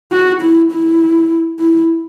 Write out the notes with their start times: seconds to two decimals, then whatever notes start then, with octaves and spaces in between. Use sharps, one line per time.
0.12 F#4
0.41 E4
0.71 E4
1.60 E4